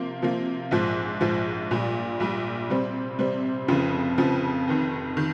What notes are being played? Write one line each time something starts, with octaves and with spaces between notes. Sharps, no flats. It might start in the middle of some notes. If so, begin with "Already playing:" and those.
Already playing: C3 F3 A#3
C3 F3 A#3
A#1 G#2 F3
A#1 G#2 F3
A#1 A#2 G3
A#1 A#2 G3
C3 G3 C4
C3 G3 C4
F1 F2 C#3 F3
F1 F2 C#3 F3
F1 F2 D#3
D#3